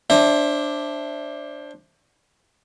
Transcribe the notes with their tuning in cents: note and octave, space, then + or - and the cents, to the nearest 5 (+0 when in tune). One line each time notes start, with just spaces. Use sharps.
D4 +0 C5 +25 E5 +0